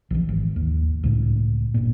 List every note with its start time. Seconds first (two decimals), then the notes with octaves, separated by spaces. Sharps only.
0.11 A#1 E3
0.29 G#1
0.56 D#2
1.03 C#2 A2
1.74 G1 G2 A#2